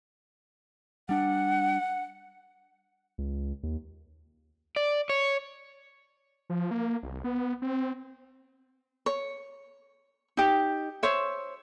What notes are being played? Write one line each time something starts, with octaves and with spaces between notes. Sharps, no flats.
G3 D4 F#5
C#2
D#2
D5
C#5
F3
A#3
C2
B3
C4
C#5
D#4 G4
C5 C#5 E5